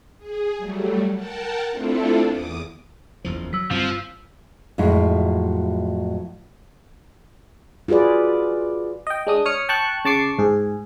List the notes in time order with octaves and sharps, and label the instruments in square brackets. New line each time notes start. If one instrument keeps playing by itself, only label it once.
[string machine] G#4
F#3 G3 A3
A#4 F#5 G5 A5
A3 C4 D4 E4 F4 A4
E2 D6 D#6
[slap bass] F#1 E2 F3
[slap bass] F#3 [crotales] E6 B6
[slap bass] G2 C4 [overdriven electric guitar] F3
[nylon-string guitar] F2 A2 F#3 G#3 E4
[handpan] F4 F#4 G#4 B4 D5
[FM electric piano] D#5 G5
G#3 D4 D#6
C#5 D#6 F6 C#7
G5 A5 C#6 F#6
C#3 A5 C#6 D6 C7
G#2 G#4